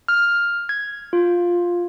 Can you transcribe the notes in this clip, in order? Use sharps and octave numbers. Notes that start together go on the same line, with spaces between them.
F6
G#6
F4